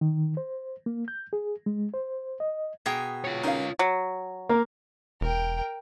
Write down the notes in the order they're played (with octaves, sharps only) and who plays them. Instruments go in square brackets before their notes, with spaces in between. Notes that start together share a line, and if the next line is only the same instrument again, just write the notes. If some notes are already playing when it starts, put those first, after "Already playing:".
[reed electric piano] D#3
C5
A#3
G6
G#4
G#3
C5
D#5
[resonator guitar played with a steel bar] B2 G#4 G5 [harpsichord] A#5
[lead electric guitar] F4 C#5
[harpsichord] C#4 A#4 [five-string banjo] D#4 F5
[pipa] F#3
[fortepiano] A#3
[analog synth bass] E1 [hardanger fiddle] A#4 G5